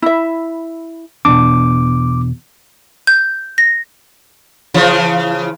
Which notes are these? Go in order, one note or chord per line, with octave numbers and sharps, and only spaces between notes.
E4 E5 B5
E2 B2 D4 D6
G6
A#6
C#3 E3 F3